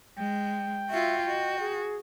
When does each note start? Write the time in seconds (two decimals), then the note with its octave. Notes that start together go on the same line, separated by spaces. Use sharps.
0.18 G#3 G5
0.90 F4 F#4 E5
1.27 F#4 D#5
1.60 G#4